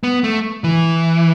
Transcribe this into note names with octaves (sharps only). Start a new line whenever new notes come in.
B3
A3
E3